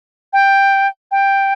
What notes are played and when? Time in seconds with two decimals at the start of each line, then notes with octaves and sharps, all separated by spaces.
0.33 G5
1.11 G5